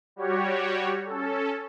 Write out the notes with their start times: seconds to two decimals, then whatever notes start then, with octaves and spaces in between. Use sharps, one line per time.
0.16 G3 F#4 G4 C#5
1.05 C#4 A4